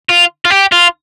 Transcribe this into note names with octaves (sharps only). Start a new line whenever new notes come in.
F4
F4
G4
F4